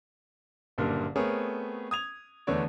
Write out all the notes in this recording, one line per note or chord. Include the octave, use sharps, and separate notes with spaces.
F#1 G2 A#2 D3 A#4
A3 B3 C4 G#4 A#4 C#5
D#6 G#6 F7
E2 D3 A3 B3 C#5 D5